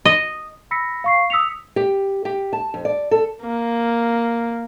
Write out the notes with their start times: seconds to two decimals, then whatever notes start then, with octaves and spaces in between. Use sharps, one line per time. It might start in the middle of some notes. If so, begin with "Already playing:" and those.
0.05 D#5
0.71 B5 E6 A#6 B6 C#7
1.04 F5 C#6 C7
1.30 D#6 E6 B6 C#7 F7
1.76 G4
2.25 G4
2.53 A5
2.74 F2
2.85 D5
3.11 A4
3.42 A#3